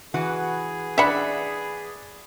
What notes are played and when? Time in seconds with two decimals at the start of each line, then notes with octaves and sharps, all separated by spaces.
0.14 E3 F#4 G#4 B4
0.98 D4 E5 F#5 B5